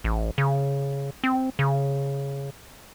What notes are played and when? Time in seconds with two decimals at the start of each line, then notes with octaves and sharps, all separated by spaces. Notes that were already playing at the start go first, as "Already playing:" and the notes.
0.04 A1
0.38 C#3
1.24 C4
1.59 C#3